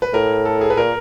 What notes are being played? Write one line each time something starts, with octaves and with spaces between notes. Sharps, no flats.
B4
A2 A#4
A4
G#4
B4
A#2 A#4